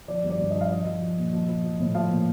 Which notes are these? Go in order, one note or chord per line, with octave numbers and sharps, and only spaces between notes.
F3 D5
G2
D5
G2
F3 D#5
F5
F3 D#5
F3
F3
A#2
F3
F3
F3
A2
F3 F5
A#2